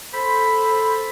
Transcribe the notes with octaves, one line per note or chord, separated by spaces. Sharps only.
A4 C5 B5